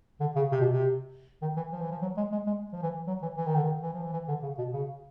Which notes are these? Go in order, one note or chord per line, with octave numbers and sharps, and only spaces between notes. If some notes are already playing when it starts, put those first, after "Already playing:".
D3
C#3
C3
B2
C3
D#3
E3
F3
E3
F3
F#3
G#3
G#3
G#3
F3
E3
F#3
E3
E3
D#3
D3
D#3
E3
F3
E3
E3
D3
C#3
B2
C#3